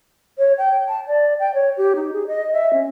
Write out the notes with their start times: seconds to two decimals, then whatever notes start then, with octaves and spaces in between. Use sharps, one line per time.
0.38 C#5
0.58 G5
0.88 A5
1.08 D5
1.40 G5
1.54 C#5
1.77 G4
1.96 D#4
2.13 G#4
2.28 D#5
2.53 E5
2.73 C#4